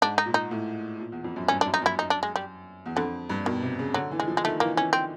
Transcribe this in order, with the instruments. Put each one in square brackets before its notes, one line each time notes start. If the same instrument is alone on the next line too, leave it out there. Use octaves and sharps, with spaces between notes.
[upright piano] G#2 [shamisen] D4
[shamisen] D#4
[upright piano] A#2
[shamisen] D#4
[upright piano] A2
A#2
E2
F2
F#2
[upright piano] G2 [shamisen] C#4
[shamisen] D4
[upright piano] F#2
[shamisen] D#4
[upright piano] F#2 [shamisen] E4
[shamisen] D#4
D4
G#3
G3
[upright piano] E2
[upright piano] F2 [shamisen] D3
[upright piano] G2
[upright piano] B2 [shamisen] D#3
[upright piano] C3
C#3
[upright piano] D3 [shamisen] F#3
[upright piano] E3
[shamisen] G#3
[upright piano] F3
[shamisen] G#3
[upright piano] D#3 [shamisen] A3
[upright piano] E3 [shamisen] A#3
[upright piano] E3 [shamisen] C#4
[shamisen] C4